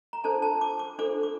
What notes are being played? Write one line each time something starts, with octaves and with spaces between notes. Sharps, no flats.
A#5
D4 A4 C5 A5
A5
D6
D6
D4 A4 C5 D6
D6